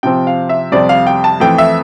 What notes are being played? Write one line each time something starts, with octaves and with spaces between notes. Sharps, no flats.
C3 F3 C4 G5
F5
E5
F2 C3 G3 C4 D5
F5
G5
A5
F2 E3 A3 C4 G5
E5